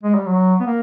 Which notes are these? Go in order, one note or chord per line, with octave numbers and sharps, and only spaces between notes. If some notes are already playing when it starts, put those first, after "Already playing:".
G#3
G3
F#3
B3
A#3